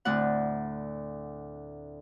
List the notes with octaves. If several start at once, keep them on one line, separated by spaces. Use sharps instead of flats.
D2 A2 C4 F#5